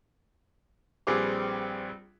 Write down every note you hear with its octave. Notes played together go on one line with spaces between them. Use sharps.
A#1 G3 C4 G#4 B4 D6